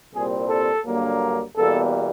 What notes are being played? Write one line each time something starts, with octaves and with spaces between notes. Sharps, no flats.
C2 A#2 G3 C4 G#4
A4
G2 D3 F#3 A#3
E2 B2 G3 A#3 A4